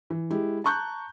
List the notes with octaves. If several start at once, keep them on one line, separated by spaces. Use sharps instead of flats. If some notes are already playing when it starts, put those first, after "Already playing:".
E3
G#3 E4 G4
A5 A#5 C#6 F#6 G6